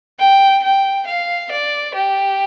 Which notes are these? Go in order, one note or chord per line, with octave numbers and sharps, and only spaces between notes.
G5
G5
F5
D5
G4